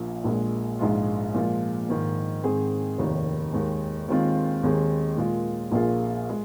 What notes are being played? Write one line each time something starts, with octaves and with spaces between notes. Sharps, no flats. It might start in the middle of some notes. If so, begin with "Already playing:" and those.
Already playing: A#1 A#2 F3
A#1 A#2 G#3
A#1 G#2 G#3 F4
A#2 F3 G#3 F4
G#2 D#3 A#3
G#2 D#3 C4 G#4
F1 D#2 D#3
D#2 D#3 G#3
D#2 D#3 G#3 C4 F4
D#2 D#3 G#3 C4 G#4
A#2 G#3 F4
A#1 A#2 A#3 F4 G#4
G#3